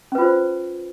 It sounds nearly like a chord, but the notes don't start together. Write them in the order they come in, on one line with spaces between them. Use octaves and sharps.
C#4 B4 F4 C5